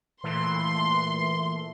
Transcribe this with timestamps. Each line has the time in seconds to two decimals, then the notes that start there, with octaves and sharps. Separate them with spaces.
0.24 A#2 E3 A3 C6